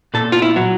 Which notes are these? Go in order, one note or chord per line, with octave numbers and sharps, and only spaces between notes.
A#2 A4
F4
E4
F#3